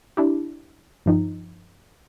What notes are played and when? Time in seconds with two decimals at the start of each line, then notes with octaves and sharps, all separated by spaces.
0.17 D4 E4 G4
1.06 G2 F3 D#4